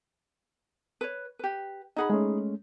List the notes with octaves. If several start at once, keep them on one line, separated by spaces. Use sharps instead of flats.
B4 C#5
G4 B4
D#4 G#4 D#5 F#5 B5
G#3 A3 C#4